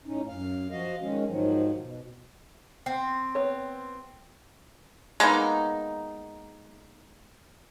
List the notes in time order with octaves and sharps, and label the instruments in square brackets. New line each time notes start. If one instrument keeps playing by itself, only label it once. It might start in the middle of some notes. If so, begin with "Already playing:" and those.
[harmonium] A2 C#4 D#4
F#2 F5
F3 F#4 D#5 F5
D#3 G#3 C#4
G#2 D#3 F3 F#3
B2
[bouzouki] C4
[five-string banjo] B3 C#5
[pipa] G#3 A#3 B3 D#4